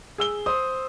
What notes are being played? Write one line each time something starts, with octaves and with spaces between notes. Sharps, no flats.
G#4 E6 G7
C5 C6 D#6